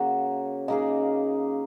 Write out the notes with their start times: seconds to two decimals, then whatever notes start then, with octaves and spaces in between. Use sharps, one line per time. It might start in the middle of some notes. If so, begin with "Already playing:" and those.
Already playing: C#3 F#3 A#3 C#4 F#4 F#5
0.68 C#3 A#3 D#4 G#4 D#5